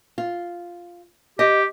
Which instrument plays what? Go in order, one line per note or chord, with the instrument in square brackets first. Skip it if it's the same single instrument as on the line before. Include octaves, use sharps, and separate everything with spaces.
[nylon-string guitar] F4
[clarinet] G4 [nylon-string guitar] D#5